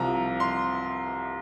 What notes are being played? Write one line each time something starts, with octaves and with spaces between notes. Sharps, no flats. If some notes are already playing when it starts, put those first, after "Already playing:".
Already playing: C2 C3 F3 A#5
C6